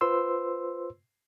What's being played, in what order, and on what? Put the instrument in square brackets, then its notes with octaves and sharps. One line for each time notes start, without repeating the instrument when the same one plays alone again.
[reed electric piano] F4 B4 C5 C6 E6